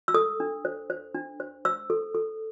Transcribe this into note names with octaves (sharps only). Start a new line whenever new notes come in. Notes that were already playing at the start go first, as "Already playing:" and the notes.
E6
A4 D#6
D4
C5
C5
D4
C5
C5 E6
A4
A4